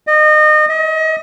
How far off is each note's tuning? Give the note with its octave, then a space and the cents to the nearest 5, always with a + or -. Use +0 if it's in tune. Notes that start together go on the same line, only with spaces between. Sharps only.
D#5 -30
D#5 +35